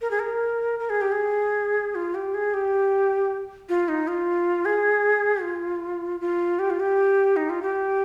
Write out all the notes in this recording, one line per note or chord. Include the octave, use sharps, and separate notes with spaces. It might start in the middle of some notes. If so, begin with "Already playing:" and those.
A#4
G#4
A#4
A#4
G#4
G4
G#4
F4
G4
G#4
G4
F4
D#4
F4
G#4
F4
F4
G4
F4
G4
D#4
F4
G4